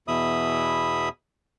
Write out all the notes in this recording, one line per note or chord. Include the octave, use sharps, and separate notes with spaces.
E2 B2 E3 E5 B5 D#6